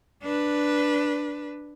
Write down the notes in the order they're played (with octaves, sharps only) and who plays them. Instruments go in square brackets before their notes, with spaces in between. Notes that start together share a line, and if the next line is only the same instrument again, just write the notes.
[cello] D4 B4